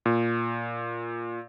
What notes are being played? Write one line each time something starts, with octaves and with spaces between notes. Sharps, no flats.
A#2